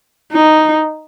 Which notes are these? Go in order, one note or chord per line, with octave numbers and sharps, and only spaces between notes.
D#4